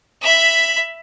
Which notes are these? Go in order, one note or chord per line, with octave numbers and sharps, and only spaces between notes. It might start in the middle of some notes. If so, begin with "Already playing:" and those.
E5 B5